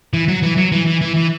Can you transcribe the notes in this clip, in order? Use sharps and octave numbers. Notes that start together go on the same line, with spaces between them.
E3
F#3
E3
F#3
E3
E3
E3
E3